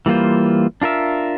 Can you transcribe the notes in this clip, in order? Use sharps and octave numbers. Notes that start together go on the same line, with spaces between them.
E3 G3 A#3 F4 C5
D4 F4 A#4 E5